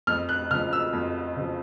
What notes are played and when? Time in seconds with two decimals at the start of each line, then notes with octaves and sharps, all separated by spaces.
0.07 F2 F6
0.29 F#6
0.51 C#3 F6
0.54 F3
0.73 E6
0.93 F2
1.37 C#3 F3